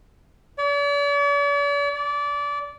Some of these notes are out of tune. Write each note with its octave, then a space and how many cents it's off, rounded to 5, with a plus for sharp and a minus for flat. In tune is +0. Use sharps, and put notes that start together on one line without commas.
D5 -45
D5 -25